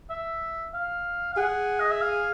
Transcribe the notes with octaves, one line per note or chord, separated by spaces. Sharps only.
E5
F5
F5
G#4 F#5
D#5
E5
F5